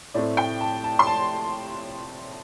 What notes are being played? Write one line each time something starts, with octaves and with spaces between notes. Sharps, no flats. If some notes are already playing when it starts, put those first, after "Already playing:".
A2 A3 C4 D5
G5
A5
A5
C6
A5